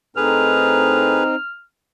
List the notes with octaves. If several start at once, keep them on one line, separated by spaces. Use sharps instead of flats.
A2 C4 D#4 G#4 A4 B4 F6